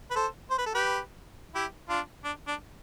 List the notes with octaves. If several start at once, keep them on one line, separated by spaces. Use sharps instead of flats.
B4
A4 C5
C5
B4
A4
G4 B4
E4 G4
D4 F4
D4
D4